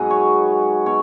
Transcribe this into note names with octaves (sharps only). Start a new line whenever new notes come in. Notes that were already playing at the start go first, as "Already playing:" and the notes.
Already playing: G#2 B2 F#3 F#4 G#4 B4
C#5
B2 C#5